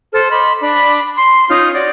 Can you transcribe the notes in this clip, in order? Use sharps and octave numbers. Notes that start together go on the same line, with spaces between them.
A4 C5 F6
D#5 B5 C6 D6
D4 B5 D6
C6
C#4 D#4 F4 G6
F#4 C#5 D5